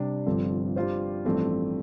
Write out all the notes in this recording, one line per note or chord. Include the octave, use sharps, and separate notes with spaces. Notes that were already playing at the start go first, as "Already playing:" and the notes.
Already playing: C3 G3 D4
G1 G2 F3 C4 A4
G2 G3 F4 C5
A1 G2 F3 A3 C4